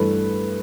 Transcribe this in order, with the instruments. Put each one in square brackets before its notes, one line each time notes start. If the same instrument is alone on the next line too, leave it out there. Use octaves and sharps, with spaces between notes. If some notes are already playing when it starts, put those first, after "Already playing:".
Already playing: [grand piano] G2 E3 A3 B4